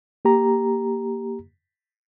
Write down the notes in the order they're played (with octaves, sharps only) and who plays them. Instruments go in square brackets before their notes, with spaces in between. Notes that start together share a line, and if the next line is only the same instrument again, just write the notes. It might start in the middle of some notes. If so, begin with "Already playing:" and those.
[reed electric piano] A#3 G4 A#5